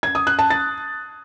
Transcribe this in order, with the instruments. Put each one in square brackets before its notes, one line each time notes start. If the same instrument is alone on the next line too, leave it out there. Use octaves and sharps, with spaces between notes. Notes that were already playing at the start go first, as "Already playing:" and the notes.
[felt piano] G#6
D#6
F#6
A5
A6